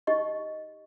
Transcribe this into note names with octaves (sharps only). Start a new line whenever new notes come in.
D#4 G4 D#5 C#6